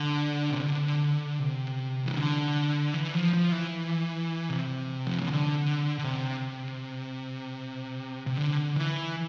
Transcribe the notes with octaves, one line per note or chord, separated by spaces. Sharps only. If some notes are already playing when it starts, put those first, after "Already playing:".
Already playing: D3
C3
D3
C3
E3
D3
E3
F3
F3
E3
C3
F3
E3
D3
D3
C3
C3
D3
E3